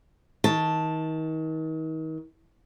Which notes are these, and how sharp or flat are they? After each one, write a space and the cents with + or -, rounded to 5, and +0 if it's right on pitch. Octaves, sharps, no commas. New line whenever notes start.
D#3 +35 A5 +0